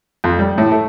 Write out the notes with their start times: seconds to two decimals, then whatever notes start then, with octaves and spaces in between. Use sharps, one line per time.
0.24 F2
0.39 G3
0.58 A2
0.72 A3